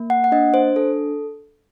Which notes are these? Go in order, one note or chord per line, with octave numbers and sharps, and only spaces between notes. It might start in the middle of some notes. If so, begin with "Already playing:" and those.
Already playing: A#3
F#5
F#5
D4 D#5
C5
A4